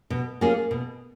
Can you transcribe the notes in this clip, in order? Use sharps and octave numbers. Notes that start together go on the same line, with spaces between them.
B2
A#3 C#4 F4 G#4
B2